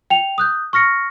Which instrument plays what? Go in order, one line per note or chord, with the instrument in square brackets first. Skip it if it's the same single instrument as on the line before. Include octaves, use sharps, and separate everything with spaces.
[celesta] G5 F7
D#6 F#6 G6
C#6 F6 A#6 C#7